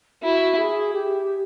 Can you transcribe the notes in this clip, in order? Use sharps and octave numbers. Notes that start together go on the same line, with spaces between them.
E4 F#4
G#4
G4